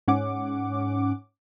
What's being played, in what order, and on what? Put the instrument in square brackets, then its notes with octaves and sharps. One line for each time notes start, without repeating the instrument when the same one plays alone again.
[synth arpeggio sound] G#2 C#4 F#5 D6